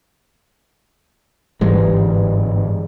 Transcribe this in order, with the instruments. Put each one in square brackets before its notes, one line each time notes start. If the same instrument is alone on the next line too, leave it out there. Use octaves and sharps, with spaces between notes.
[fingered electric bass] G1 G#2 G#3 [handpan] E3 G3